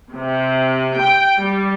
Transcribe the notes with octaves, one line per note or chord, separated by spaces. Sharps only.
C3
G5
G3